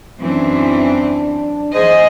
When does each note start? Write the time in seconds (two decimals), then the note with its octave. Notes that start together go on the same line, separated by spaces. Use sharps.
0.19 F#2 E3 C4 D4
1.74 E2 G#4 C5 D#5